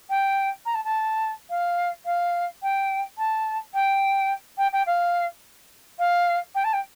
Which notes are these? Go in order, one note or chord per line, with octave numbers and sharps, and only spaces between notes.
G5
A#5
A5
A5
F5
F5
G5
A5
G5
G5
G5
F5
F5
G5
A5
G5